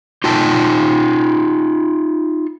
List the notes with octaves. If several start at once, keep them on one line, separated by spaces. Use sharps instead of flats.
D#4 F4 G5 A5